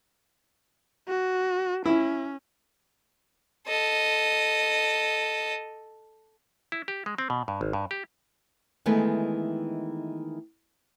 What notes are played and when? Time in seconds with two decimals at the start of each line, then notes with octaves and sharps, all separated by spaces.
1.08 F#4
1.86 C#4 E4
3.67 A4 D#5
6.72 E4
6.88 G4
7.06 G#3
7.18 C4
7.30 B2
7.48 G2
7.61 G#1
7.73 G2
7.91 G4
8.86 D#3 E3 G#3 A3 B3